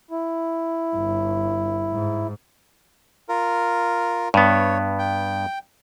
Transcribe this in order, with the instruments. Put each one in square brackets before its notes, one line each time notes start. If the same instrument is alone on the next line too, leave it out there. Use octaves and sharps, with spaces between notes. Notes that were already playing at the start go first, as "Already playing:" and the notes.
[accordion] E4
[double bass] G1
G#2
[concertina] F4 A#4
[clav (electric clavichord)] G2 B3 [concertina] C#5
[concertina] G5